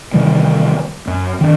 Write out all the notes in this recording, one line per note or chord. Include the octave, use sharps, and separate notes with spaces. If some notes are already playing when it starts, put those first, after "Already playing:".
C3 D#3 E3 G3
F#2
D#3 D4